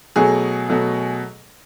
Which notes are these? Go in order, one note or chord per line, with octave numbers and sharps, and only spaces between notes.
B2 F#3 A3 G#4
B2 F#3 A3